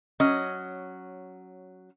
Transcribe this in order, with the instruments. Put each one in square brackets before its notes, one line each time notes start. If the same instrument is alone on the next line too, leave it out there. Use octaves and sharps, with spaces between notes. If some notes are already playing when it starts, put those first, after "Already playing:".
[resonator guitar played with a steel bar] F#3 C#4 D#5